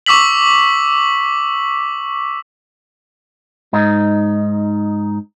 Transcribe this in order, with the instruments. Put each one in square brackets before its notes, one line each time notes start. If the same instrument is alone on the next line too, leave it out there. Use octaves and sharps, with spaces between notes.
[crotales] C#6 D6 E6 B6 F#7
[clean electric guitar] G#2 D#4